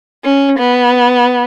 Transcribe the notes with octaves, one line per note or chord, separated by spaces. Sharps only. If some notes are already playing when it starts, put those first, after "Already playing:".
C#4
B3